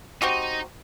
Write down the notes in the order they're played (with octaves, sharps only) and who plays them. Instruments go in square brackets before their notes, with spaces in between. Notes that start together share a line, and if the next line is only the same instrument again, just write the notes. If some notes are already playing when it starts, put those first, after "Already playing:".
[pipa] C4 F#4 G4 [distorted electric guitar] D#4